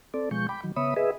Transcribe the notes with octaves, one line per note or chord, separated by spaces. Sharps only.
C4 A4 D5
B2 F3 G#3 C#6 G6
G5 B5 D6
D#3 F#3
C#3 B3 C#5 E5 B5 D#6
G#4 B4 D#5 E5